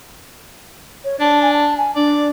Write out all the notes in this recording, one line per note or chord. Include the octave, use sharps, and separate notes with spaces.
C#5
D4 A5
G#5
A5
G#5
D4 D5